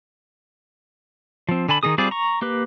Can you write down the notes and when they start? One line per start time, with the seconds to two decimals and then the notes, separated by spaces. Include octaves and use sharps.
1.49 F3 C4
1.69 D3 G#5 A5 B5
1.83 D#3 D4 D#4 G#4 D#6
1.98 G3 C4 F4 G#4 D5
2.11 A#5 C#6
2.42 A#3 G4 B4